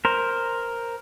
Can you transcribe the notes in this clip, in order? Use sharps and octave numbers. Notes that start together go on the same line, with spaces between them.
A#4 C5